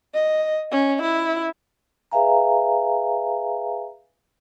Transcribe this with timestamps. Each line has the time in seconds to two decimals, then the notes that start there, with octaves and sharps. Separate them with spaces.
0.14 D#5
0.71 C#4
1.02 E4
2.11 G#4 B4 E5 F5 G#5 A#5